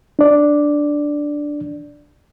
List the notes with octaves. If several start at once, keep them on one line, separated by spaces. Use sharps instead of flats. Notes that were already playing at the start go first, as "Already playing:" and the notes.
D4 D5